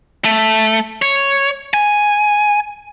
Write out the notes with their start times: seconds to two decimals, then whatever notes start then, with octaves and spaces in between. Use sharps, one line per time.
0.25 A3
1.02 C#5
1.74 G#5